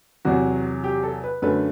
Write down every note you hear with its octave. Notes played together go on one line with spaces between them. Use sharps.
E2 C3 F#3 F#4
G4
A4
B4
F#2 D3 A3 B4